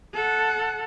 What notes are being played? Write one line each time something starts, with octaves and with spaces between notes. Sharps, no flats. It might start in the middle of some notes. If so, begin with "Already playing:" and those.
A4 F#5